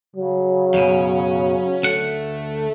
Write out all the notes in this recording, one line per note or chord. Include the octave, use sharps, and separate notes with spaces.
C#3 F#3
F#2 B2 C#4
D2 A3 F#5